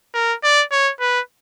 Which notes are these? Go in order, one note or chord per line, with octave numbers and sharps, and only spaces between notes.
A#4
D5
C#5
B4